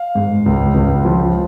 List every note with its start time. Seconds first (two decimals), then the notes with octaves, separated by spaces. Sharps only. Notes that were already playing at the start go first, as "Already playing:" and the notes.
Already playing: F5
0.15 G#2
0.46 C#2
0.74 C#2
1.05 F3